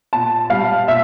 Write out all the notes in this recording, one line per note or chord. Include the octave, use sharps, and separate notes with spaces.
A#2 A5
G3 F5
A#2 E5